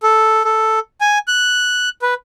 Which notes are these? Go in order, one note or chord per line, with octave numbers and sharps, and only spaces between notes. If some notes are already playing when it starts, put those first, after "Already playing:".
A4
A4
G#5
F#6
B4